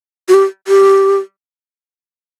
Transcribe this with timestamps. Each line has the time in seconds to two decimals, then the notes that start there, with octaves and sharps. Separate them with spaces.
0.28 F#4
0.34 G4
0.67 G4